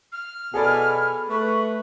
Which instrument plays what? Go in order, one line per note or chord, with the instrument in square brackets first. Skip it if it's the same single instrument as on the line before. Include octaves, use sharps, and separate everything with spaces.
[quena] F6
[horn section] B2 G#5 [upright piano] G#4 A4 D5 [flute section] B5
[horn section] A3 B4 [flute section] C#6